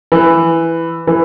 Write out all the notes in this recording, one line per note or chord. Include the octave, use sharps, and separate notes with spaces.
E3
E3